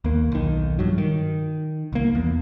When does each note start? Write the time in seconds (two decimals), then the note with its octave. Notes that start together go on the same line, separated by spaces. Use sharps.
0.04 D#2 A#3
0.32 B1 D#3
0.79 G2 F#3
0.98 D#3
1.93 C2 A#3
2.15 E2